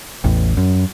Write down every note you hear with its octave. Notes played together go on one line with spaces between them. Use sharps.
A1 E2
F#2